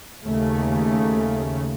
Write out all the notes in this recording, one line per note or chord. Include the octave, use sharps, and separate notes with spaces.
D#2 C#3 A3